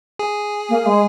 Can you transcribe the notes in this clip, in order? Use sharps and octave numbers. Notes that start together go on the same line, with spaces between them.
G#4
A#3
G#3